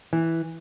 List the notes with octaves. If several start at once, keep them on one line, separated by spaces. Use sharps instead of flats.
E3